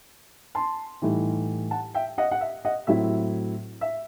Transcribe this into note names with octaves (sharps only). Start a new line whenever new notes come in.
A5 C6
A2 E3 G3 D#4
F#5 A5
E5 G5
D#5 F#5
F#5
E5
D#5 F#5
A2 F#3 C4 E4 E5
E5